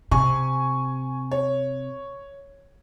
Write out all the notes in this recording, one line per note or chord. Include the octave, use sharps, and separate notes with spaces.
C3 G#5 C#6
C#5